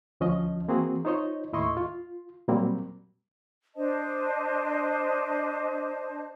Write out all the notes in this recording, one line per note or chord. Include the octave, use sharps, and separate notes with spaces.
D2 F3 C#4 D#5
E3 A#3 C4 F#4 G#4
D#4 F4 C5 C#5 D#5
D#2 A2 E4 D#5 C6 C#6
F4
A#2 F#3 G3 A#3 C4
D4 C5 D#5 A5